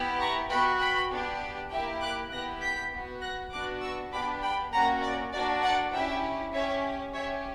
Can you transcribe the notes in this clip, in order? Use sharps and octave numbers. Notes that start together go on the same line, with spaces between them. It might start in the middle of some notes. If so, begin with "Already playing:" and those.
Already playing: B3 E4 G4
A#5 C#6
B3 F#4 G5 B5
G5 B5
B3 D4 G4
A#3 E4 G4 E5 G5
D6 F#6
B3 E4 G4 F#6 A#6
G6 B6
B3 F#4
F#6 A#6
B3 D4 F#4 D6 F#6
C#6 E6
B3 D4 G4 B5 D6
G5 B5
A#3 C#4 F#4 F#5 A#5
D5
A#3 D4 F#4 D5
D5 F#5
C#4 E4 G4 E5 G5
C#4 G4 C#5 E5
C#4 G4 C#5 E5